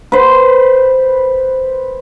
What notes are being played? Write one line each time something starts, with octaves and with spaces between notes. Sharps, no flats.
B4 C5